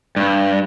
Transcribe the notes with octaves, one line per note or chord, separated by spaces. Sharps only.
G2